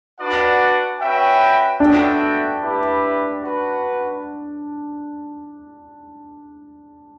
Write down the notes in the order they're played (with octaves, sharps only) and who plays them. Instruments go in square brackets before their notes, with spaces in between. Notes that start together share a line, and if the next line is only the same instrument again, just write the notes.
[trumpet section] D4 F#4 B4 D5 F#5
C#4 F#4 B4 E5 G5
[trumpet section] B3 F#4 A4 E5 G5 [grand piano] D4
[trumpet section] E4 G4 B4 E5
F#4 B4 F#5